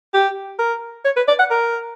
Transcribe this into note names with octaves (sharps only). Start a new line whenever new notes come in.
G4
A#4
C#5
B4
D5
F#5
A#4